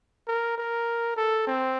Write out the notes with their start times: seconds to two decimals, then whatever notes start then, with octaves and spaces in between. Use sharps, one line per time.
0.28 A#4
0.58 A#4
1.17 A4
1.47 C4